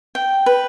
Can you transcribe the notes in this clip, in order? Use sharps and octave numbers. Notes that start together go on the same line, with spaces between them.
G5
B4